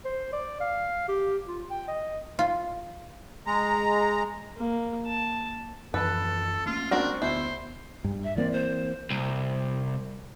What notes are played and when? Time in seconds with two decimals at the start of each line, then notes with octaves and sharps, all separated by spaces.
0.05 C5
0.33 D5
0.60 F5
1.08 G4
1.48 F4
1.70 G5
1.88 D#5
2.39 F4
3.47 G#3 A#5
4.57 A#3
5.07 A5
5.94 F#2 E3 F3 A4 B4
6.66 A3 A#3 C#4 F4
6.91 C4 D4 F#4 A#4
7.22 D2 B3 E4 C5
8.04 G2
8.24 E5
8.36 E3 A#3 C4 D5
8.53 C5
9.10 C2